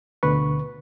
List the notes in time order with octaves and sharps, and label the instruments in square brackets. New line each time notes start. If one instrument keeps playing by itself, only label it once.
[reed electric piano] D2 B2 D3 B4 C#6